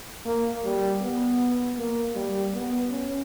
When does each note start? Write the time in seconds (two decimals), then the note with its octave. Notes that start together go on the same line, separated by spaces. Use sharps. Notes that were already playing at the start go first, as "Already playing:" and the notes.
0.25 A#3
0.64 G3
1.01 B3
1.78 A#3
2.15 G3
2.54 B3
2.91 C#4